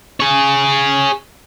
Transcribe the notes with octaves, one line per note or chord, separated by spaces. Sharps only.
G#4 C#5